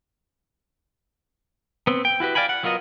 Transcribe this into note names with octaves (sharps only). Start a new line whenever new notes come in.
B3 C4
G5
E4 F#4 G4 B4
D5 F5 G5 G#5 B5
F#5
F#3 B3 F4 A#4 D#5